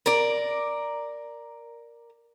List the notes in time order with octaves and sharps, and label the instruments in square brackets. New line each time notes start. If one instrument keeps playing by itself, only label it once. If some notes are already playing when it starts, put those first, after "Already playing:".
[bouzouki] A#4 D5